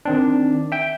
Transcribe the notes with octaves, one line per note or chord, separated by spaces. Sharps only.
D#3 C4 D4
E5 G5